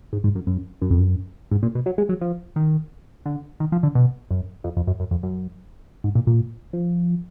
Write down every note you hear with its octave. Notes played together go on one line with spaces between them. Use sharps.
G#2
G#2
F#2
F#2
F#2
F2
F#2
G#2
A#2
B2
F#3
G#3
F#3
F3
D#3
D3
D#3
F3
D3
B2
F#2
F2
F2
F#2
F#2
F2
F#2
G#2
A#2
A#2
F3